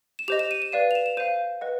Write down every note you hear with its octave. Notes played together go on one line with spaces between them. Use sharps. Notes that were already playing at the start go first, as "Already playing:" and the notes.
E7
G4 C5 D#5 F7
E7
D#7
E7
B4 D5 F5 D#7
F7
E7
E7
C5 F5 D#7
B4 D#5 F#5